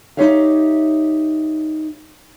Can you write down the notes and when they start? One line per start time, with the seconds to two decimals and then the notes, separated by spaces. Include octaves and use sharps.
0.17 D#4 E4 G4 C#5 E5 F5